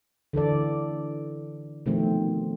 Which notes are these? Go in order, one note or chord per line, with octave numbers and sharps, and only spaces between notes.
D3 E3 A4 D5
B2 D#3 F3 A3 C4